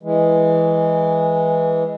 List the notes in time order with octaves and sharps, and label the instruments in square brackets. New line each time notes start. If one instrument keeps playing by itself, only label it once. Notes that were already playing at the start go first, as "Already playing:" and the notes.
[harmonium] E3 G#3